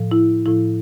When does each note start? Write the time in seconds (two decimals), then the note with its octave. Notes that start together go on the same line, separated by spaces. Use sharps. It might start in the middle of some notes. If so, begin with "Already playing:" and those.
Already playing: A2 F3
0.11 E4
0.46 A2 F3 E4